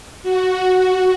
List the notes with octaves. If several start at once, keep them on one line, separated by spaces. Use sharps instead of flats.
F#4